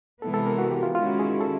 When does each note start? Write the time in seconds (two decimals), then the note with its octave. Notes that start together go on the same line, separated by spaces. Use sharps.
0.21 C3 E3 G#3 B3 A4
0.34 A4
0.47 A#4
0.58 F#4
0.71 G4
0.83 F4
0.95 D#3 G#3 C#4 E4 F4
1.07 F#4
1.19 G#4
1.41 A4